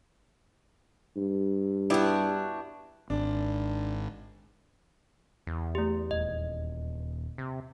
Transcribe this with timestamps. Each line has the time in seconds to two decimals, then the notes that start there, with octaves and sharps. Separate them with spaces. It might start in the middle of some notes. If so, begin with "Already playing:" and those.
1.17 G2
1.90 B3 D4 E4 F#4 G4
3.10 G#1 D4
5.47 E2
5.75 A3 G4
6.11 D#1 D#5
7.38 C3